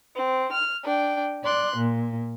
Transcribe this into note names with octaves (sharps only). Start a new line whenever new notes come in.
C4
F6
D4 G5
D5 C6 F#6
A#2